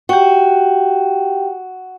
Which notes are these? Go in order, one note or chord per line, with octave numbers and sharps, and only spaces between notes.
F#4 G4 G5